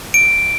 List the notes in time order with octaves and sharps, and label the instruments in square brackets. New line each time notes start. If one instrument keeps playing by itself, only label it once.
[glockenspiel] D7